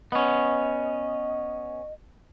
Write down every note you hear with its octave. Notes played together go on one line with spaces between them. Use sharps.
B3 C#4 D#5